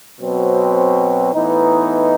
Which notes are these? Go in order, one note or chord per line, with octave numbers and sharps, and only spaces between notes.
B2 F#3 C4
A2 E3 B3 D#4